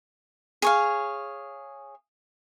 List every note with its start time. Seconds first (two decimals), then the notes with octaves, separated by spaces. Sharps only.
0.62 G#4 C#5 F5